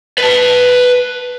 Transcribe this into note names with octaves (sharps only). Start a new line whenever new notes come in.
B4 A5